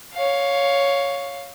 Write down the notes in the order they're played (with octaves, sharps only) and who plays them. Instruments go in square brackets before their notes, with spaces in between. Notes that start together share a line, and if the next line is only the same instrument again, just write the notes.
[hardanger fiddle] C#5 F5